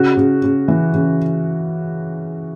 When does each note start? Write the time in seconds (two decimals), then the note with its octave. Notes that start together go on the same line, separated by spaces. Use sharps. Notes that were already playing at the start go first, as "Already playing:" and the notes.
Already playing: C#3 F#4
0.17 C#3
0.44 C#3
0.68 E3
0.94 C#3